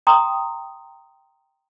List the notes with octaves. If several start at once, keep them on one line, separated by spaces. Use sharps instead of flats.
G5 A#5 C6 D#6